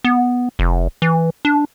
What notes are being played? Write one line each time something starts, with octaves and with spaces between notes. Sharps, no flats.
B3
F1
E3
D4